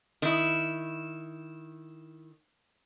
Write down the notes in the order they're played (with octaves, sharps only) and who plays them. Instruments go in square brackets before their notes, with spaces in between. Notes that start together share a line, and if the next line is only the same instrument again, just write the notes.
[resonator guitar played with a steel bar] D#3 E4